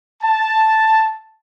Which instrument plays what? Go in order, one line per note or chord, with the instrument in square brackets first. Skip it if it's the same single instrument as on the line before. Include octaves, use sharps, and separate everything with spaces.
[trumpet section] A5